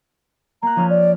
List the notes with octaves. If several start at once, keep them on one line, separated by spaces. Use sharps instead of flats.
A#3 A#5 F#6
F3 C#4 F6
D5